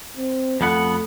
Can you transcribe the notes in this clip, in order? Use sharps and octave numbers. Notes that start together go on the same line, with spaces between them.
C4
F2 A3 B3 F#5